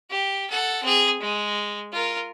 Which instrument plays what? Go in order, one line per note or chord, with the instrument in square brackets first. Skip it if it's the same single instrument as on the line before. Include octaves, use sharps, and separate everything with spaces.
[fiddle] G4
A4 F#5
C4 G#4
G#3
F4 A#4